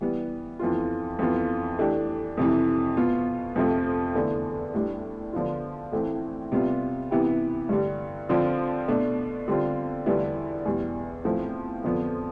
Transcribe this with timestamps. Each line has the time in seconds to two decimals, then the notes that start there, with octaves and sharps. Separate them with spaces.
0.01 E3 G3 B3
0.59 F2 E3 B3 F4
1.19 F2 E3 B3 F4
1.79 E3 A3 D4 G4
2.37 F2 C3 E3
2.97 B2 B3 F4
3.56 F2 C3 F3 A3
4.14 E2 D3 A3 D4
4.74 A2 G3 D4
5.33 D3 F3 B3 F4
5.92 A2 E3 A3 C4
6.52 C3 G3 B3 F4
7.11 C3 E3 B3 E4 G4
7.69 G2 D3 G3
8.29 D3 F3 C4 F4
8.88 B2 A3 D4
9.48 D3 G3 C4 F4
10.06 E2 D3 G3 B3 E4
10.65 E2 B2 G3
11.24 A2 F3 A3 C4
11.84 F2 D3 F3 B3